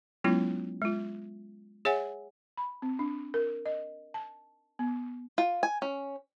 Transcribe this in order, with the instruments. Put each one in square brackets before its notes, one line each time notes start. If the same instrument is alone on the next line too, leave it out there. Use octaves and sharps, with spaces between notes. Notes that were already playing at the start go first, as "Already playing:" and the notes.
[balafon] F#3 G#3 B3 C#4 E4 F4
G#3 F4
G#4 C#5 E5 F#5 G#5
B5
C4
D4
A#4
D#5
A5
B3
[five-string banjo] F4
G#5
C#4